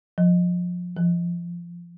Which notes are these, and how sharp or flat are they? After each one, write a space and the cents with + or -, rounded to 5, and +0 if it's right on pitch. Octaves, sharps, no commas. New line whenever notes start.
F3 +25
F3 -20